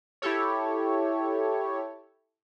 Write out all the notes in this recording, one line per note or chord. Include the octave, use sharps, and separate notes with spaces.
E4 G4 A4 C#5